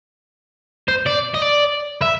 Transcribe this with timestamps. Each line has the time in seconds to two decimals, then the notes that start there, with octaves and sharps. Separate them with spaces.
0.88 C5
1.06 D5
1.34 D#5
1.42 D5
2.02 E5